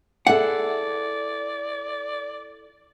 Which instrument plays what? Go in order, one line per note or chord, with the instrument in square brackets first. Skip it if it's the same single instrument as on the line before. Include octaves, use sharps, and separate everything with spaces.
[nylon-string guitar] E4 G#4 A4 [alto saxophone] D5 [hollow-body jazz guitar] F#5